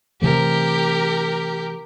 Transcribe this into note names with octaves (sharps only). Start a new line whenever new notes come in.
C3 E3 A3 G4 A#4